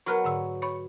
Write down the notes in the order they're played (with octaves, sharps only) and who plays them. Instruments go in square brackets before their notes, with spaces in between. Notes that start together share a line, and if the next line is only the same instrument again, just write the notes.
[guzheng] F#3 B3 [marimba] C#6 F6 F#6
[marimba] G#2 D3 E6
C#5 B5 C#6